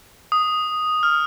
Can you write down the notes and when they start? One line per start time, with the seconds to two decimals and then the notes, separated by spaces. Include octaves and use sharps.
0.32 D#6
1.03 F6